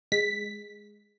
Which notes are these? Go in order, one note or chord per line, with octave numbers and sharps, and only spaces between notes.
G#3 B6